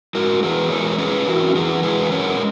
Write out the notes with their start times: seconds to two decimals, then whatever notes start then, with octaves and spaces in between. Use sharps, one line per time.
0.15 G#3 F#4 A#4
0.43 E3 G#4 B4
0.70 G#3 A#4 C#5
0.98 C#4 G#4 B4
1.27 E3 F#4 A#4
1.55 E3 G#4 B4
1.83 G#3 G#4 B4
2.11 C#4 A#4 C#5